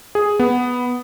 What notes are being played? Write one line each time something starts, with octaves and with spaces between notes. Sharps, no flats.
G#4
B3